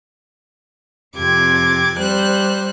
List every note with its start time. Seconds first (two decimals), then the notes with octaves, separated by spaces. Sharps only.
1.17 F2 C3 D6 G#6
1.99 G3 C5 F#6